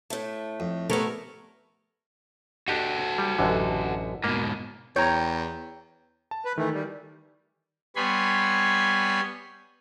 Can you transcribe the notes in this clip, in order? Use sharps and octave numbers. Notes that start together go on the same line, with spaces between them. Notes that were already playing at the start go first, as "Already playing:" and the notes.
A2 A3
F2
G3 A3 B3 A#4 C#5
D4 F#4 G4 A4 D#5
G3
A1 F#2 D3
G#2 B2 A#3
E2 C#5 G5 A#5
A5
B4
D#3 E3 A3
G3
G3 B3 C#5 G#5 B5 C6